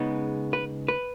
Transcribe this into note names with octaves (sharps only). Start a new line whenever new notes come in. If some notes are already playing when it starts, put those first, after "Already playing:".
Already playing: C#3 G#3 B3 D#4
B4
B4